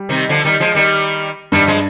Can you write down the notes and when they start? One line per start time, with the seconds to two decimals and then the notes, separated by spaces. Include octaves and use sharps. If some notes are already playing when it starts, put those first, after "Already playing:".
Already playing: G3
0.09 C3 D#3
0.29 D3 F3
0.45 D#3 G3
0.60 F3 G#3
0.75 D#3 G3
1.52 G2 D#3 G3
1.67 F3 G#3